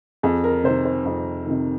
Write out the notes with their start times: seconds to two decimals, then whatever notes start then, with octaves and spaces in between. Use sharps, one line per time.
0.23 F2 G#4
0.44 A#4
0.64 C3 D#3 C5
0.85 C5
1.05 F2
1.46 C3 D#3